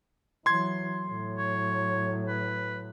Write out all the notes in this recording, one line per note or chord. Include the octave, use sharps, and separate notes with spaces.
E3 F#3 C6 G#6
A2 F#3
C#5
B4